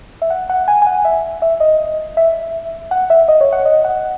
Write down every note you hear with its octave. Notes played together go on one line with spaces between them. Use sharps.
E5
F#5
F#5
G#5
G#5
F#5
E5
E5
D#5
E5
F#5
E5
D#5
C#5
F#5
D#5
F#5